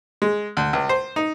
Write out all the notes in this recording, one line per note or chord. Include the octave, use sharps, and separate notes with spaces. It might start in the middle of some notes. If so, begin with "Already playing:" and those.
G#3
D2
C#2
C5
D#4